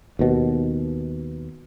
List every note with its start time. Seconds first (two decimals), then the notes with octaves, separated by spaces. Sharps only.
0.19 D#2 B2